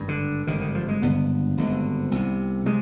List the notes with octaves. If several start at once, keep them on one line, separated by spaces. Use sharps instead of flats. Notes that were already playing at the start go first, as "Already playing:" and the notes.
Already playing: G#1 G2
D3
G#1 G2 D3 D#3
D#3
F3
G#3
G#1 G2 D3 B3
G#1 G2 D3
C2 C3
C3 G#3